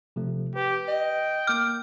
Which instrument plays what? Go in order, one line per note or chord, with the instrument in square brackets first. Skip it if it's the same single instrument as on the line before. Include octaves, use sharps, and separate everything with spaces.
[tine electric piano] C3 F3 A3
[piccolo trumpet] G4 [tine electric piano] B4
[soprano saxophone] D#5 [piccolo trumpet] G5
[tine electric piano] A#3 G6 [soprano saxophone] D6 [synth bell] F6